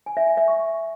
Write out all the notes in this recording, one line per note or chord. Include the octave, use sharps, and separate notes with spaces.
G#5
E5
G#5
E5
C#6